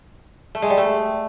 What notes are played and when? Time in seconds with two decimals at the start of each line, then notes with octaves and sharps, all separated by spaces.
0.55 A3
0.62 G#3
0.70 G3
0.78 A3